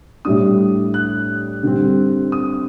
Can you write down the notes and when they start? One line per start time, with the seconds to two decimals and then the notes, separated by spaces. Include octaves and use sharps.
0.25 A2 G3 D4 D#6
0.94 F#6
1.63 D3 G3 C4
2.32 D#6